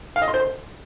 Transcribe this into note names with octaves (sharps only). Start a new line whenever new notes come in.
F5
D#5
C6
C5
C6